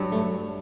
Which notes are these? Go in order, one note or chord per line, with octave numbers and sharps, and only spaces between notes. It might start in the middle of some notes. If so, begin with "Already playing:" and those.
Already playing: G2 F#3
A3